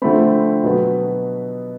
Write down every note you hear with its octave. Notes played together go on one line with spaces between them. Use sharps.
D3 F3 A3 C4 B5
B2 F#3 B3